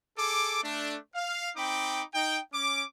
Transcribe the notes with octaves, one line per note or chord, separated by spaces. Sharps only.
G#4 A4 D6
A3 D4
F5
C4 D#4 G5 B5 D6
D#4 G5
C#4 D6